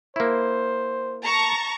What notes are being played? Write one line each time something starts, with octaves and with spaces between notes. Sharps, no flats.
A#3 E4 C5
A5 A#5 C#6